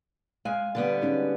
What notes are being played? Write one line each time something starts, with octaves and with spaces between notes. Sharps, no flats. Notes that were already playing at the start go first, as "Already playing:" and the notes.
G#3 F5 G#5
D3 G3 B3
G#3 C#4 D#4